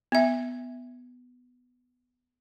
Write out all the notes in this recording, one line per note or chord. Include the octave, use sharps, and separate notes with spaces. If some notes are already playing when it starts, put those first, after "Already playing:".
B3 E5